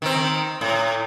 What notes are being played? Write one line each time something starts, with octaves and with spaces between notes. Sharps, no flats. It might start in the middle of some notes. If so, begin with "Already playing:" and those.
D#3 C4
A2